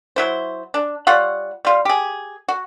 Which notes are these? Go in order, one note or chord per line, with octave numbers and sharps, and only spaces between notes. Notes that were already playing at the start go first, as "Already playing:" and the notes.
F#3 E4 C5
D4
G3 F4 C#5 F#5
G3 F4
G4 G#4
F#4